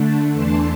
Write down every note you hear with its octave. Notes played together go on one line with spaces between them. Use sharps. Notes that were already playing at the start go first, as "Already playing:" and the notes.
Already playing: D3 A3 D4
E2 E3 A3 D4 A5 C6